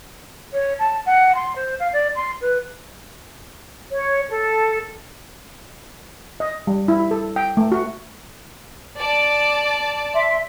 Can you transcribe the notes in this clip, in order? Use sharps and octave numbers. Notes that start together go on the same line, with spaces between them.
C#5
A5
F#5
C6
C5
F5
D5
C6
B4
C#5
A4
D#5
G3
E4
A4
G5
A3
F#4
D5 A5 D6
E5 C6